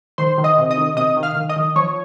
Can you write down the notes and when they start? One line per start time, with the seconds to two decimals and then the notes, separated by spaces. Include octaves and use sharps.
0.18 D#3 C5 C6
0.38 D#3
0.44 D#5 D#6
0.58 C3
0.71 D#5 D#6
0.77 D#3
0.97 C3 D#5 D#6
1.17 D#3
1.23 F5 F6
1.36 D#3
1.49 D#5 D#6
1.56 D#3
1.76 F3 C#5 C#6